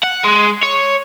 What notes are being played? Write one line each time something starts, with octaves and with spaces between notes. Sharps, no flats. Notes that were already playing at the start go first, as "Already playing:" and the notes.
F#5
G#3
C#5